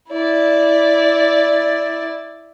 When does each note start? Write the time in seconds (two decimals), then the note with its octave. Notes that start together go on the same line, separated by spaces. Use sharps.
0.11 E4 D5